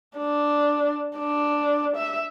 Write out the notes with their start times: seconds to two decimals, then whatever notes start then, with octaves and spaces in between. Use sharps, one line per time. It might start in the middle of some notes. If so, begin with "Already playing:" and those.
0.17 D4
1.18 D4
1.96 E5